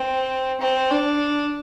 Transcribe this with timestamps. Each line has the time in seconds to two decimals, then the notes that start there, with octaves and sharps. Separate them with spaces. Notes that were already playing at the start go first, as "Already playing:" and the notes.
Already playing: C4
0.61 C4
0.91 D4